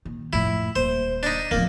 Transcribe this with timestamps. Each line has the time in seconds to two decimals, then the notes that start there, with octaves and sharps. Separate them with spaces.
0.05 A#2 D#3
0.33 F2 A2 E4
0.76 D#1 C5
1.23 D4 D#4
1.51 D1 F3 A#3